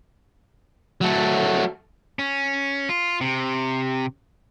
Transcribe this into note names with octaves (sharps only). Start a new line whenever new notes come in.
F#3 A3
C#4
F4
C3